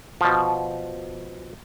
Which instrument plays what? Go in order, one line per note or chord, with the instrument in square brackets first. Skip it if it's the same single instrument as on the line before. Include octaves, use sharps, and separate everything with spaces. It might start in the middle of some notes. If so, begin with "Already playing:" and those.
[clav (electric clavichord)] B2 F3